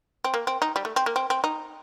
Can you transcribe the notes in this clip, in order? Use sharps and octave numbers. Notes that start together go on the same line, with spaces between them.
C4
A#3
C4
D#4
G3
A3
C4
A#3
C4
C4
D#4